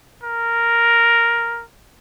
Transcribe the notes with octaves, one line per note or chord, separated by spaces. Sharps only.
A#4